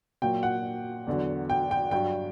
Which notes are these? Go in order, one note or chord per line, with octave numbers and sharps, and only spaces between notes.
A#2 F#3 G5
F#5
E2 D3 F#3
G5
G5
G2 F#3 G5